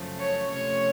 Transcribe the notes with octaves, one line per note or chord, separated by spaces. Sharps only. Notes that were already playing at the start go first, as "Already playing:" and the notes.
Already playing: F#2 C#3 F3 A3
C#5
C3 F3 A3 C#4 F4 C#5